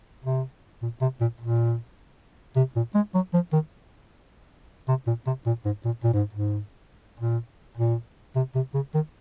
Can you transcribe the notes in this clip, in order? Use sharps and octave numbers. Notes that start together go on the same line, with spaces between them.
C3
A#2
C3
A#2
A#2
C3
A#2
G#3
F#3
F3
D#3
C3
A#2
C3
A#2
G#2
A#2
A#2
G#2
G#2
A#2
A#2
C3
C3
C#3
D#3